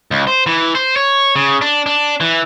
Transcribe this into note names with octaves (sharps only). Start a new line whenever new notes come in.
C#2
C5
E3
C5
C#5
C#3
D4
D4
E3